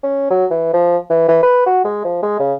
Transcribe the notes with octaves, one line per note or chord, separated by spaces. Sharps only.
C#4
F#3
E3
F3
E3
E3
B4
F#4
G#3
F3
G#3
C#3